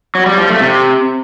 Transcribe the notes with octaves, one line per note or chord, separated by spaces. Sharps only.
F#3
G3
F3
A3
C3